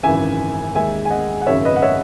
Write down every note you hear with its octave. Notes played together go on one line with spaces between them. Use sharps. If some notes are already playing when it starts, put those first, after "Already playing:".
G#1 F#2 C#3 E3 E5 G#5
D#2 D#3 G#3 E5 G#5
G#5
D#5 F#5
F#5
G#1 F#2 C#3 C#5 E5
B4 D#5
F#5
C#5 E5